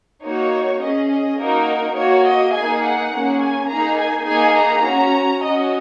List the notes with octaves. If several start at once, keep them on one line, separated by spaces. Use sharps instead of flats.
A#3 D#4 F#4 C#5
C#4 G#4 D#5
D#5
A#3 D#4 F#4 A#4
A#3 F#4 C#5
D#5
A#3 D#4 G#4 G#5
F#5
A#3 C#4 G#4
G#5
A#3 D#4 G#4 A#5
G#5
A#3 D#4 G#4 G#5
A#5
C#4 F#4
C#4 F#4 D#5